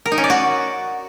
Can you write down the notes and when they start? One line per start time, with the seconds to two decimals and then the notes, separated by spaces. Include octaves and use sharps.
0.06 A#4
0.12 D#4
0.18 C#4
0.24 D5
0.30 F#4